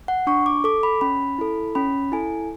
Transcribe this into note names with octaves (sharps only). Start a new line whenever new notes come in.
F#5
D4 C#6
D6
A4 D6
B5
C#4 B5
E4 A4
C#4 B5
E4 A4 G#5